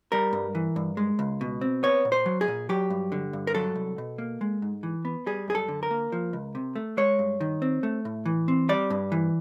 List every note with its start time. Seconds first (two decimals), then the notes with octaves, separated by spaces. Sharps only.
0.12 G3 A#4
0.33 G2
0.55 E3
0.76 G2
0.97 G#3
1.19 C#2
1.41 B2
1.61 C4
1.83 B3 C#5
2.05 A#2
2.12 C5
2.26 F#3
2.41 G#4
2.48 A#2
2.69 F#3 G4
2.90 G2
3.12 D3
3.33 G2
3.47 A#4
3.55 F#3 A4
3.76 C2
3.98 B2
4.18 A#3
4.41 G#3
4.62 G#2
4.83 E3
5.05 B3
5.26 G3 G#4
5.48 F#2 G#4
5.55 A4
5.68 D3
5.83 A#4
5.91 A#3
6.12 F3
6.33 C#2
6.55 C3
6.76 A3
6.97 G#3 C#5
7.19 G2
7.41 D#3
7.62 C4
7.83 A3
8.05 A2
8.26 E3
8.48 C4
8.69 G3 D5
8.90 G2
9.12 E3